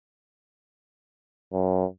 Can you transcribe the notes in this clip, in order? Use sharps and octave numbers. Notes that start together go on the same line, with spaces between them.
F#2